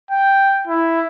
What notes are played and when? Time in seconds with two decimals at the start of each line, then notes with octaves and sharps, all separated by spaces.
0.11 G5
0.67 E4